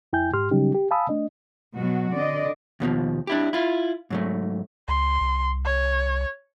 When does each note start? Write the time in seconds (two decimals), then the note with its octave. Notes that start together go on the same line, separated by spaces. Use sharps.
0.13 F2 E4 G5 G#5 G6
0.33 G#2 G4 C6 F6
0.51 C#3 F#3 G3 C#4 D#4 G4
0.74 G4
0.91 F5 G#5 A5 B5 D#6 E6
1.09 A3 D4 D#5
1.76 B2 F#3 F#4
2.13 D3 C4 D5 D#5
2.80 D#2 B2 D#3 F3
3.27 D4 E4 G4
3.53 E4 F4
4.10 G#2 F#3 A3
4.88 C#2 C6
5.21 C2
5.65 C#5